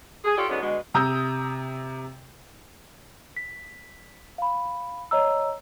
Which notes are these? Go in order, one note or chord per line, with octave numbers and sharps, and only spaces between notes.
G#4
F4 G4 A4 C#5 D5
D3 F#3 G#3 B3 C#4 D#4
B2 D3 G#3
C3 A#5 D#6 E6 G6
B6
F5 B5
C#5 D#5 A#5 E6